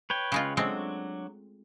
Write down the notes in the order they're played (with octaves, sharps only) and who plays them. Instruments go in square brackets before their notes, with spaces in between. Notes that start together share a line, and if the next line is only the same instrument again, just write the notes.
[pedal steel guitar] B4 C#5 G5
[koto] C#3 G#3 F4
[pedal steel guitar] F#3 D4 F#4 [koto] G#3 A3 C4